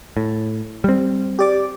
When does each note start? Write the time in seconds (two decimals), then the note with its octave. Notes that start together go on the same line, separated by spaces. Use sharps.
0.17 A2
0.84 G3 C4
1.39 G4 D5 D6